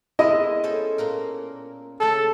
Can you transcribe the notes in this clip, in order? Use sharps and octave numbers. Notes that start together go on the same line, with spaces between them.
G#3 B3 E4 A#4 D#5
C#4 A4 C5
A#2 A#3 A#4
C#3 A3 A4